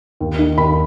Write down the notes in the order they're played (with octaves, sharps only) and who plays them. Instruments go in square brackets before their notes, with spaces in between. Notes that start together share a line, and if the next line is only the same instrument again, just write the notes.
[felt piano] D#2
D#3
D#2 B5